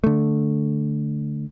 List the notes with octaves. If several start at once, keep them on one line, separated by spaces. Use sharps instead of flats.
D3 A3